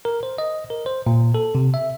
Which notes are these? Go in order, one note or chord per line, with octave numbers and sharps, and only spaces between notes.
A#4
C5
D#5
A#4
C5
A#2
A4
C3
E5